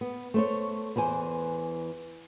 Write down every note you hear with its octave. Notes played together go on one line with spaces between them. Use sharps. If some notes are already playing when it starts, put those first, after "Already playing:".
B3
A3 C5 C#5
E2 E3 C5 G#5